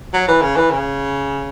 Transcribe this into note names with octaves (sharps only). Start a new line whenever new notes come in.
F#3
E3
C#3
E3
C#3